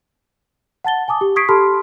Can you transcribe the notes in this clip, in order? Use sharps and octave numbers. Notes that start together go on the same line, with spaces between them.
F#5 A5 A6 G7
G#5 A5 D6 D#6
G4
C#6 D#6 G#6 B6 C7 D7
G4 A4 A5 B5 C6 F6